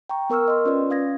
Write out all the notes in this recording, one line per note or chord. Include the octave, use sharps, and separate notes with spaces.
G5 A#5 C#6
B3 A#4 C#6 E6 F6
D#5 C6
C#4 F4 B4 D5
C#4 F5 D#6 G#6 A#6